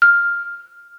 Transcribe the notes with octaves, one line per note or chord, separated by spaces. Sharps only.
F6